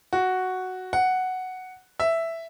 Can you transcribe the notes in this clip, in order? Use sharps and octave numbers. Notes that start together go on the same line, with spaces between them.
F#4
F#5
E5